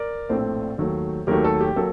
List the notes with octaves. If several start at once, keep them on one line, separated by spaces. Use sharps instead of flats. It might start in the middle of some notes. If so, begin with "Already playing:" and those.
Already playing: A#4 D5
A#1 A2 A3 C4 A4 C5
D#2 D#3 F#3 A3
D#2 D#3 F#3 A3 G4 A#4
A4
G4
F#3 A#3 A4